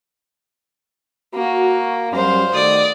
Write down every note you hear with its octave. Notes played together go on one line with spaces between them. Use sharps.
A#3 F#4
F#2 G3 C5 F5
D#3 A3 F#4 D5 D#6